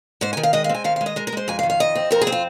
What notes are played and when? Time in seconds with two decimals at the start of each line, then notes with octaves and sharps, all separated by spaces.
0.21 G#2 C5
0.33 D#3 G#5
0.43 F5
0.53 G#3 D#5
0.64 F5
0.69 C4
0.74 G#5
0.84 D#3 F5
0.96 F5
1.01 G#3
1.06 D#5
1.16 G#3 A#4
1.27 A#4
1.32 G#3 C5
1.48 F2 G#5
1.59 F5
1.63 D#3
1.70 F5
1.80 F2 D#5
1.95 C4
2.11 F2 A#4
2.21 G#4
2.27 C4
2.32 F4